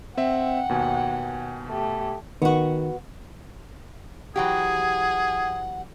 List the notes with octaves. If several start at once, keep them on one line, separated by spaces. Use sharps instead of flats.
C4 E5 F#5 G5
D#2 B2 G#5
A3 G4
D#3 B3 F#4
E3 F#3 G4 G#4 F#5